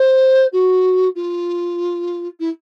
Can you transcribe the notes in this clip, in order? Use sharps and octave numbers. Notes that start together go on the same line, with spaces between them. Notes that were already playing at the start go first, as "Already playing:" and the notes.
Already playing: C5
F#4
F4
E4